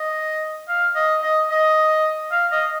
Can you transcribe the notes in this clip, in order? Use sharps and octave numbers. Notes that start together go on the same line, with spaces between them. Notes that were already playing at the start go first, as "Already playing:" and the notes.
Already playing: D#5
F5
D#5
D#5
D#5
F5
D#5